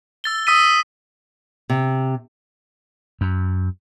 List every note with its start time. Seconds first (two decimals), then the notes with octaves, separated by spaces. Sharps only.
0.24 E6 A6 G7
0.47 D#6 E6 B6 D#7
1.70 C3
3.21 F#2